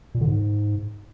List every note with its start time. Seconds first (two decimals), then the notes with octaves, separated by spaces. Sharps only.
0.15 A#2
0.21 D3
0.27 G#2